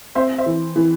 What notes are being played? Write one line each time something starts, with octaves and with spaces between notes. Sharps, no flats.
C4 C5 E5
C5 E5
E3
E3